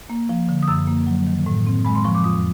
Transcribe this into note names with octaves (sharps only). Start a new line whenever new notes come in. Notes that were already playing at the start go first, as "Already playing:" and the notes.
A#3
F3
D3
D#6
F#2 E6
A#3
F#3
D#3
A2
C4
G#3 B5
C6
F3 C#6
D6
F2 D#6